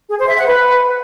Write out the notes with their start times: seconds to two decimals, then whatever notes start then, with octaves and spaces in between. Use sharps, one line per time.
0.10 G#4
0.19 C5
0.28 E5
0.37 F#5
0.46 B4